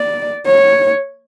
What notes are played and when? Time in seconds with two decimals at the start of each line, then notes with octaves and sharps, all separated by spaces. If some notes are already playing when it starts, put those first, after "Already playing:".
Already playing: D5
0.46 C#5